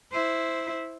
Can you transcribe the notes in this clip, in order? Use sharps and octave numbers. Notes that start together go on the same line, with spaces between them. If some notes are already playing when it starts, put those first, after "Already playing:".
E4 C5